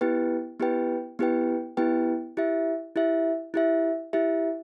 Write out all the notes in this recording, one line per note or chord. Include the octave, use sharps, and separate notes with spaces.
B3 E4 G4 B4 G5
B3 E4 G4 B4 G5
B3 E4 G4 B4 G5
B3 E4 G4 B4 G5
E4 G4 E5
E4 G4 E5
E4 G4 E5
E4 G4 E5